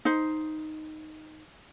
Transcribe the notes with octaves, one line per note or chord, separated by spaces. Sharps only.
D#4 C5